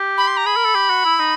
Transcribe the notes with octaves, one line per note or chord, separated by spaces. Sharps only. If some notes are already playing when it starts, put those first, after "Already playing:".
Already playing: G4
B5
C6
A#5
G#4 B5
A#4
A4
G4
F#4
E4
D#4